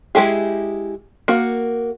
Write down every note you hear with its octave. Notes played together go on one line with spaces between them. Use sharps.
G#3 E4 G4 G#4
A#3 F#4